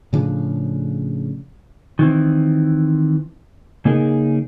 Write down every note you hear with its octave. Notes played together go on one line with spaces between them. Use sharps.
A2 C#3 F3 D4
D#3 E3 C4
C#3 A#3 D#4 G#4 A#4